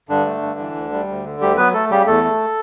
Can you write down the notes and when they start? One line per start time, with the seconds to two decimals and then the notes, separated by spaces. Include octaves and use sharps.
0.09 G2 D3 D4
0.25 A3
0.42 G2
0.59 E3
0.75 D2
0.92 G3
1.08 D2
1.25 D3
1.40 D2 G3 G4
1.57 F#3 B3 B4
1.74 A3 A4
1.90 C#3 G3 G4
2.06 E2 A3 A4
2.24 A3